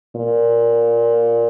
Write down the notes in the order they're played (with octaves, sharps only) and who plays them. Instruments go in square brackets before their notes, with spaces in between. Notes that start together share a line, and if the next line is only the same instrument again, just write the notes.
[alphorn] A#2